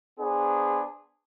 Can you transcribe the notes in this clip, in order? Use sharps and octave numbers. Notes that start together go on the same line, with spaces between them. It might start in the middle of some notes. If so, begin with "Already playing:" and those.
B3 D4 G#4 C5